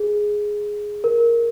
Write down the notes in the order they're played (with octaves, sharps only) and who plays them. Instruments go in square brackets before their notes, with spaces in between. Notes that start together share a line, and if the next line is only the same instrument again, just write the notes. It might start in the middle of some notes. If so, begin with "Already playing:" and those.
Already playing: [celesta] G#4
A#4